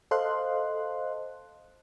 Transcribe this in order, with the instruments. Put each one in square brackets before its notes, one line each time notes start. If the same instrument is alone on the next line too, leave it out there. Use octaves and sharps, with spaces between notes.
[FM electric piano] A4 C5 D#5 F5 C6 F#6